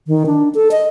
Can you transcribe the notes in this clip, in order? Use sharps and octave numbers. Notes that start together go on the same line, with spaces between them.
D#3
D4
A4
D#5